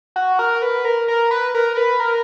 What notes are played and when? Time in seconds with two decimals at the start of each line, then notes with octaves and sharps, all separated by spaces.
0.16 F#4
0.39 A#4
0.62 B4
0.85 A#4
1.08 A#4
1.31 B4
1.54 A#4
1.77 B4
2.00 A#4